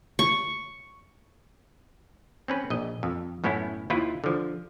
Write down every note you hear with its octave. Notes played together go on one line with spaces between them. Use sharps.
C#6
C4 C#4 B4
A#1 D#5
F2
F#2 A2 B3 C#4 E4
D#2 E4 F4 B4
D3 F3